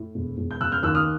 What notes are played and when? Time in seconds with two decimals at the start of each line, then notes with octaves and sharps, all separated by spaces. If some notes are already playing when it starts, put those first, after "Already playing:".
Already playing: A2
0.15 E1
0.37 E1
0.51 G6
0.61 C#3 E6 F#6
0.72 F6 G6
0.83 D#2 E6 F#6
0.95 D#6 F6